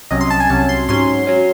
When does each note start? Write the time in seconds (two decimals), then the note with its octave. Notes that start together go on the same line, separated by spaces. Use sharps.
0.11 C2 C3 F#3 C#4 D#5
0.21 C6
0.30 A5
0.40 G#5
0.50 C2 C3 F#3 C#4 A5
0.69 C6
0.88 G#2 F#3 C#4 C6
1.27 F#3 C#4